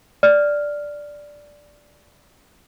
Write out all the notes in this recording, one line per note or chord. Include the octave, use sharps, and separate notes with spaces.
D5 F6